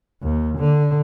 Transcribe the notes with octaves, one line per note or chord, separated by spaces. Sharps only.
D#2
D3